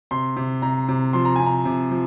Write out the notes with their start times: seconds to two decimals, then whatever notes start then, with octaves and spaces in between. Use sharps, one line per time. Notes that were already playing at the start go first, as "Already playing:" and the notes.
0.11 C3 C6
0.36 C3
0.62 C3 A#5
0.88 C3
1.13 F3 C6
1.25 A#5
1.36 C3 G#5
1.46 A#5
1.65 C3
1.91 F3